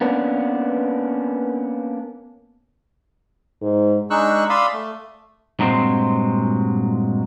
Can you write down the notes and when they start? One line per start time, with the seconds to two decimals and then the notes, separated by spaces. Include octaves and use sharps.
0.01 A#3 B3 C#4 D4
3.62 G#2
4.10 G#3 D4 D#4 C#6 E6 F#6
4.50 D5 F5 B5 C6 D#6 E6
4.73 A3
5.59 G2 A#2 F#3 G#3 C4 C5